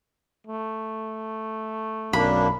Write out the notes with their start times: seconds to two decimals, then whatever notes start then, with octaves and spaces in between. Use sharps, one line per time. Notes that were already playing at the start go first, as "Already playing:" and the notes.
0.47 A3
2.13 B1 F#2 A#3 D4 B5